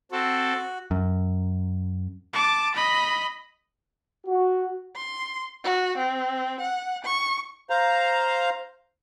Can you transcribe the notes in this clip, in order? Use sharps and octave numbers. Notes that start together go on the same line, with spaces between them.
C4 F#4 A4
F#2
A5 D6
D#5 B5
F#4
C6
F#4
C4
F#5
C#6
C5 F5 A#5